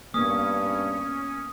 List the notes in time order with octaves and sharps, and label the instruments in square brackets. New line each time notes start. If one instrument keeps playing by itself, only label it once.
[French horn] G2 [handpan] A#3 B3 [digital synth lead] C#4 [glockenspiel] D#6